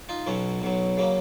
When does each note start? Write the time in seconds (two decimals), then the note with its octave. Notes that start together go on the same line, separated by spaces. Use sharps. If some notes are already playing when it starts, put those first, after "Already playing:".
0.09 D#4 F4
0.27 B1 B2 F#3 C#4
0.62 B1 B2 F#3
0.97 C#3 F#3 A#3